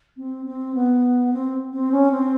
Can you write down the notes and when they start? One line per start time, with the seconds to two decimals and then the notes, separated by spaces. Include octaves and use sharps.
0.17 C4
0.46 C4
0.75 B3
1.33 C4
1.73 C4
1.92 C#4
2.11 C4